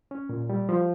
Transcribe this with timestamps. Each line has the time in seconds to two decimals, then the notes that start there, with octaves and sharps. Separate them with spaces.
0.11 C#4
0.29 A#2
0.49 G3
0.69 F3